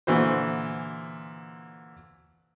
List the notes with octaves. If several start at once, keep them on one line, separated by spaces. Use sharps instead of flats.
A#2 D3 E3 F#4 C5